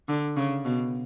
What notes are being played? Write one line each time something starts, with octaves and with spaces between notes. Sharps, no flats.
D3
C#3
B2